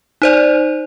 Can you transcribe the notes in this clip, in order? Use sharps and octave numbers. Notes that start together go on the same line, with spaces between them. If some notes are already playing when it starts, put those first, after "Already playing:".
D#4 C5 D5